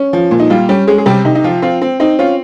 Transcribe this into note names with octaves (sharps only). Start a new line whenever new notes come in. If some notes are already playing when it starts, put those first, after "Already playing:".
Already playing: C#4
F3
A#2
D#4
G3 F4
G3 C#4 G4
G#3 C#4 G#4
G#4
C3 G3 G4
C3 D#4
D#4
F3 F4
C4 F4
C4
C4 D#4
C#4 F4